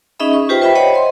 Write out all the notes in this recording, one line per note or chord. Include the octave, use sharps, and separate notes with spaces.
C#4 D#4 G#4 D#5 E5 B5
C#6
F4 G4 B4 C5 E5 G5
B4 C5 E5 G5 B5
C5 C#5 D#5 F#5 B5
D#5 C6